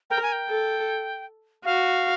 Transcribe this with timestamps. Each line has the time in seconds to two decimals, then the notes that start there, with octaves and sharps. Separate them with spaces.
0.10 A#4 G5
0.22 G#5
0.32 G5
0.49 A4
1.65 F#4 F5